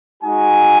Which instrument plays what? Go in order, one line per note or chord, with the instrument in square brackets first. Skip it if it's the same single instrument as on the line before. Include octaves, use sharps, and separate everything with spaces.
[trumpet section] G#3 D#4 F#4 G#5